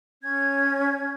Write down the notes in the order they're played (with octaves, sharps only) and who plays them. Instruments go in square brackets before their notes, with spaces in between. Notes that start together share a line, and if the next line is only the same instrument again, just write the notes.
[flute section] C#4 G#6